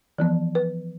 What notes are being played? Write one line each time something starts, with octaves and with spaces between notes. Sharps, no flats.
E3 F3 B3
B4